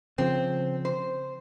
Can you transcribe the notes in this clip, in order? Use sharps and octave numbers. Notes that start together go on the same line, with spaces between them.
C#3 F3 C4
C5